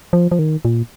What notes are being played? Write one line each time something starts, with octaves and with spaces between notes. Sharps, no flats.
F3
F3
D#3
A#2